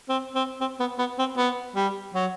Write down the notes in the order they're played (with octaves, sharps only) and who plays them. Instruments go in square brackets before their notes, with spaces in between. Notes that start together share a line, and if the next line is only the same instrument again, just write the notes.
[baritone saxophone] C4
C4
C4
B3
B3
C4
B3
G3
F#3